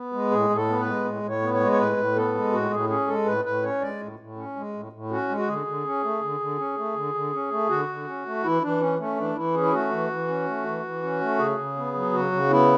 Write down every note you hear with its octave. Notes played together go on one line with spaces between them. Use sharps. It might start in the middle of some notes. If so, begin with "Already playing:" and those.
Already playing: B3
G#3
A2 G#4
A2
A4
B3
B4
G#3
A2
A2
C#5
B3
C#5
G#3
C#5
A2 B4
A2
B3 A4
G#3
A2 F#4
A2 G#4
C#4 G#4
G#3 A4
A2 B4
A2 B4
C#4 C#5
G#3 D5
A2
A2
C#4
G#3
A2
A2
C#4 F#4
G#3
F#4
D3 G#4
D3
C#4
A3
D3
D3
C#4
A3
D3
D3
C#4
A3
D3 F#4
D3
C#4
A3
E3 E4
E3 D4
C#4
A3 C#4
E3 D4
E3 E4
C#4 G#4
E4
A3 F#4
E3
E3
C#4
A3
E3
E3
C#4
A3
C#3 G#4
C#3
B3
F#3
C#3 F#4
C#3
B3 E4